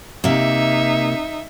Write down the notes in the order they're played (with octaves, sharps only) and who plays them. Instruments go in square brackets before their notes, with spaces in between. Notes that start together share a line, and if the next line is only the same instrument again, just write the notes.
[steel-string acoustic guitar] C3 A#3 [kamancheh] D#4 E5